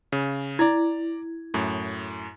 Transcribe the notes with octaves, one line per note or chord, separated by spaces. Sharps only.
C#3
E4 D5 A#5 G#6
F#2 A2